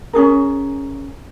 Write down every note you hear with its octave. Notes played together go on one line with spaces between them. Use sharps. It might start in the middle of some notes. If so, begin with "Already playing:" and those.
C#4 D4 G#4 A#4